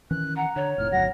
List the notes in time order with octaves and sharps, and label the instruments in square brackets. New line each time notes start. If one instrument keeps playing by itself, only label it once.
[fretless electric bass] D#3 E3 C#4 [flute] F#6
[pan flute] F#5 [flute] A#5
[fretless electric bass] D3 [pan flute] C#5
[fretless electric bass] F1 A2 [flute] F6
[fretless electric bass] G#1 D2 F#3 [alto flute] F#5 [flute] A#6